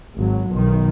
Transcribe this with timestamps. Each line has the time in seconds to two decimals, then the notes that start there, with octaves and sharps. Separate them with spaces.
0.16 G#1 F#3
0.50 B1 D#3